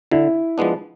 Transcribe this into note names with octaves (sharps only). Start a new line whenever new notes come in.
D3 E4
F3 G#3 B3 D4